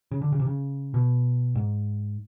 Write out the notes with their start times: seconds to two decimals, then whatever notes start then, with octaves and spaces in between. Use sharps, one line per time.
0.11 C#3
0.22 D3
0.32 C#3
0.40 C3
0.47 C#3
0.94 B2
1.55 G#2